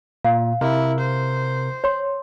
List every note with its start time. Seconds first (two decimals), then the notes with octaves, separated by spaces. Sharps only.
0.25 A#2 F5
0.61 C3 E4 A#4
1.00 C5
1.84 C#5 C6